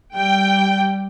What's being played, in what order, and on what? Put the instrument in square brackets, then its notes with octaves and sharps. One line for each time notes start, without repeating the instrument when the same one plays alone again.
[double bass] G3 [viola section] G5